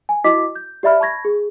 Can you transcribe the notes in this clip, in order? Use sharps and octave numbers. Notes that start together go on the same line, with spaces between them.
G#5
E4 F#4 D#5 D6 B6
G6
G4 D5 E5 B5 F6
A5 B5 C#6 G#6 A#6
G#4